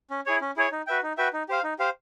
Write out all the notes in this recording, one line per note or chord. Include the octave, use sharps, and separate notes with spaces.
C#4
E4 G#4 C#5
C#4
E4 G#4 C#5
D#4
F#4 B4 E5 G5
D#4
F#4 B4 E5 G5
D#4
G4 C5 F5
D#4
G4 C5 F5